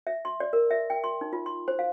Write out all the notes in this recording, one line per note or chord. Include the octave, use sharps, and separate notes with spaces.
E5
C6
D5
A#4
E5
G5
C6
D#4
F4
C6
C5
F5